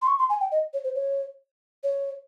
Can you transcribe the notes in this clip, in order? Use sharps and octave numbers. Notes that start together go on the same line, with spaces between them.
C6
C#6
C6
G#5
G5
D#5
C#5
C5
C#5
C#5